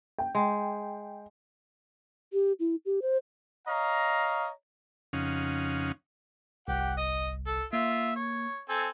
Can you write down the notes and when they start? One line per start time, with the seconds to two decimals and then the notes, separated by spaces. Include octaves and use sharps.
0.18 G5
0.35 G#3
2.33 G4
2.60 E4
2.86 G4
3.02 C5
3.67 C#5 D#5 F5 A#5
5.13 F2 C#3 C#4 D#4 F5 F#5
6.68 G1 C2 G4 F#5
6.97 D#5
7.47 A4
7.73 A#3 F4 E5
8.16 C#5
8.69 C4 A4 G#5